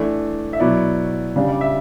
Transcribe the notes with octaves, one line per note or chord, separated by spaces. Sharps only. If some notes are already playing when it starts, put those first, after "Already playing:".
Already playing: E3 A3 D4
E5
B2 F#3 B3 E4 D5
C#3 G3 D4
D5
E5